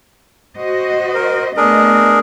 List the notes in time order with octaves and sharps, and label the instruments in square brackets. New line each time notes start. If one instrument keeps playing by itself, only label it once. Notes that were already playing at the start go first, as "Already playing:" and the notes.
[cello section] F#4 C5 D#5
[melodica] A#4
[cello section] A3 B3 D#5 [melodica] D4 G#4 A#4